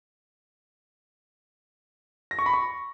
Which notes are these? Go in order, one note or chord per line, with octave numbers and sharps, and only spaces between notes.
A#6
C#6
B5
C#6